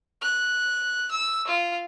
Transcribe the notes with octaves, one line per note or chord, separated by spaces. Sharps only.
F#6
E6
F4